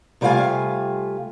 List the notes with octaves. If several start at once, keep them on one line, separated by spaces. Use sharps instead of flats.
C3 G3 A3 F4 F5 G#5